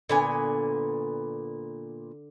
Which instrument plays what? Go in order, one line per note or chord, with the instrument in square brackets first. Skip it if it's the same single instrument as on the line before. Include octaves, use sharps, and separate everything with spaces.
[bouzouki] A#2 B3 G#5 [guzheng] D3